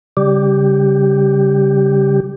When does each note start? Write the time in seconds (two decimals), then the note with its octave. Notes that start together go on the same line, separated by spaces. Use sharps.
0.17 C#3 G3 G4